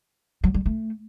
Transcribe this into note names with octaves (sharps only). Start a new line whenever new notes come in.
F#3
G3
A3